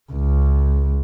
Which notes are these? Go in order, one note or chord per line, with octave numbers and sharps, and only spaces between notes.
C#2